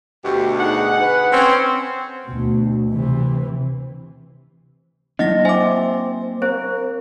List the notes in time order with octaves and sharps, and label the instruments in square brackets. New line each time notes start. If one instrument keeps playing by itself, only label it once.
[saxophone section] D2 B2 [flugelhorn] G4
[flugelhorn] D#4 [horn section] G#4 F#5
[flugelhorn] B4
[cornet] C4 [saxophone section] C#4
[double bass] D2 B2
C3 E3
[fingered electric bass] F#3 A#3 D4 [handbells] E4 F#5 A#6 [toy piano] D#5
[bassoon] C4 [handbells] E5 D6 [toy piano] G#5
[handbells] C4 [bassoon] A#4 [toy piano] C5